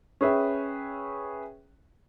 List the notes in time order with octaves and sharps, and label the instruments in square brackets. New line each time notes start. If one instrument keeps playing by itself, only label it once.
[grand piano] C#4 G#4 B4 E5 G5